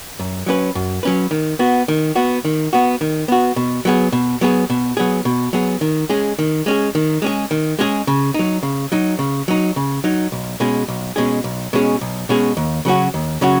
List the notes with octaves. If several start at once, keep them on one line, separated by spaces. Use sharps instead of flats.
F#2
F#3 C#4 B4
F#2
F#3 C#4 B4
D#3
B3 F#4
D#3
B3 F#4
D#3
B3 F#4
D#3
B3 F#4
B2
F#3 B3 G#4
B2
F#3 B3 G#4
B2
F#3 B3 G#4
B2
F#3 B3 G#4
D#3
G#3 C#4 G#4
D#3
G#3 C#4 G#4
D#3
G#3 C#4 G#4
D#3
G#3 C#4 G#4
C#3
F#3 D#4
C#3
F#3 D#4
C#3
F#3 D#4
C#3
F#3 D#4
B1
B2 G#3 C#4 G#4
B1
B2 G#3 C#4 G#4
B1
B2 G#3 C#4 G#4
B1
B2 G#3 C#4 G#4
D#2
C#3 F#3 C#4 F#4
D#2
C#3 F#3 C#4 F#4